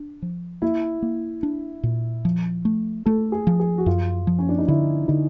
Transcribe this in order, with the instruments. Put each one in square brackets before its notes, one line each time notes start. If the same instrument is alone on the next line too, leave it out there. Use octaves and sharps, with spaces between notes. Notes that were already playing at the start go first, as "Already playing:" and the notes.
Already playing: [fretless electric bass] D4
F3
[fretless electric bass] A#3 [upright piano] E4
[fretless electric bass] A#3
D4
A#2
F3
A3
[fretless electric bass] A3 [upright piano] A4
[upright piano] G#4
[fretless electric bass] F3
[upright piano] G#4
F#4
[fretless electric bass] F#2 [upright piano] F4
[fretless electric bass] F3
[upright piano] C#4
D4
D#4
[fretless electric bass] D3 [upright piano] E4
[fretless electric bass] D3 [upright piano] D#4